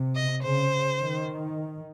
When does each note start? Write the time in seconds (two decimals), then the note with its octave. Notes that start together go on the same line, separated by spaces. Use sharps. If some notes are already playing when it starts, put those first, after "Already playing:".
Already playing: C3
0.15 D#5
0.43 C#3 C5
1.00 D#3